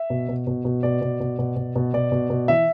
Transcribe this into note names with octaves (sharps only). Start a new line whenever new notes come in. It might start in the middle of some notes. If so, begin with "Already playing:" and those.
Already playing: E5
B2
B2
B2
B2
B2 D5
B2
B2
B2
B2
B2
B2 D5
B2
B2
E3 E5